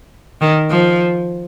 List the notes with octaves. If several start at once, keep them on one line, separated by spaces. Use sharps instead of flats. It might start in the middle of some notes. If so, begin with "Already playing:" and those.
D#3
F3